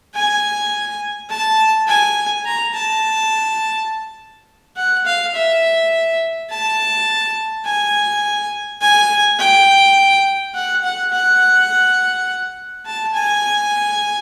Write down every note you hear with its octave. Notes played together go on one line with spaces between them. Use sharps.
G#5
A5
G#5
A#5
A5
F#5
F5
E5
A5
G#5
G#5
G5
F#5
F#5
F#5
A5
G#5